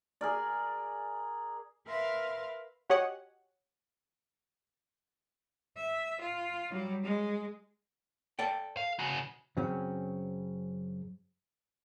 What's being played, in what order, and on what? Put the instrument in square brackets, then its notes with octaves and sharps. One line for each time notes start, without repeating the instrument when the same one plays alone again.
[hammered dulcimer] G#4 A#4 D5
[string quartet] A#4 B4 E5 F5 C6 F6
[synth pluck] F#4 G4 C#5 D#5 F#5 G#5
[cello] E5
F4
F#3 G3
G#3
[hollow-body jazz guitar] A4 D5 G5
[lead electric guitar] F5
C#3 F#4
[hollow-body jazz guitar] F#2 C#3 F#3 C4 C#4